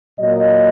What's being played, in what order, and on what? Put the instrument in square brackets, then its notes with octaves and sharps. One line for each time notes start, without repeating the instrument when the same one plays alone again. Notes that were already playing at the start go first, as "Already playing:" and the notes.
[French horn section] A#2 F#3 A#3 D#5